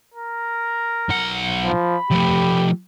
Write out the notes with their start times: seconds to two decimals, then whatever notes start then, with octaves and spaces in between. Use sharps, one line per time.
0.14 A#4
1.09 B1 F#5
1.65 F3 B5
2.11 F3 A3 G4